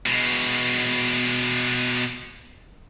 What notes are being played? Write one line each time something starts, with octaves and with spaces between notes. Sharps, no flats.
B2 G#3